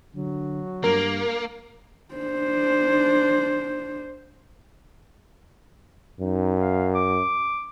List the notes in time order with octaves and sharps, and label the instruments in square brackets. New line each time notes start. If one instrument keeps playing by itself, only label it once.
[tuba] D3 [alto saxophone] F#3
[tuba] G2 [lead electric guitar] A#3 [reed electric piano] A#4
[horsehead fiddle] D4 C5
[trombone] F#2 [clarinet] D#4
[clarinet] F5
D6